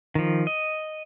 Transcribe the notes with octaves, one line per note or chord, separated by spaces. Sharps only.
D#3 F3
D#5